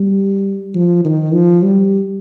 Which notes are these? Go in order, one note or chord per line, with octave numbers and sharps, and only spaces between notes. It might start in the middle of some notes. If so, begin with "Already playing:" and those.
Already playing: G3
F3
D#3
F3
G3